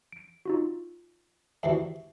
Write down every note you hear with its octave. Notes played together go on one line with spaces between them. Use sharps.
D7
D#4 F4 F#4
E2 C3 E3 F#4 E5